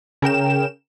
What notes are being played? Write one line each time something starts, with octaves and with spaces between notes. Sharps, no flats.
C#3 A#4 G5 E7